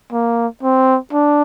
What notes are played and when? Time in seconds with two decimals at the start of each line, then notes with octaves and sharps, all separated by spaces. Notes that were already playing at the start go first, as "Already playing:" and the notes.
0.12 A#3
0.63 C4
1.13 D4